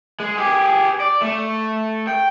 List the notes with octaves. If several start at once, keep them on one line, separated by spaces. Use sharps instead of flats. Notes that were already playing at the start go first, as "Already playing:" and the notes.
G#3
G4 G#4
D5
A3
G5